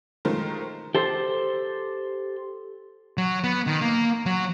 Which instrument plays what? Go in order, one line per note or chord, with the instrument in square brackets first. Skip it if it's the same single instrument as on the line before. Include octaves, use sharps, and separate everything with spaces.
[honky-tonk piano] D#3 G#3 A3 F4 A#4 C5
[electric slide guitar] G4 A4 C5
[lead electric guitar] F#3
B3
D#3
A#3
F#3